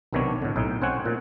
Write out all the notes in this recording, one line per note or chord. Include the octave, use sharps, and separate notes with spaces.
B1 C3 D#3 B3 D4 C#5
A2 D3
B1 A2 D#4
C4 C#4 C5 F#5 G#5
A#2